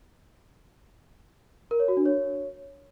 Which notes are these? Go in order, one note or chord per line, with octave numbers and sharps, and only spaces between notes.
A#4
C#5
F#4
D4
C#5